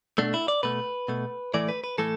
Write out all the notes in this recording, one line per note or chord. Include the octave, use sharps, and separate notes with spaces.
B2 A3 D4
E4
D5
B2 A3 B4
B2 A3
A2 E3 A3 D5
B4
B4
A2 E3 A3 A4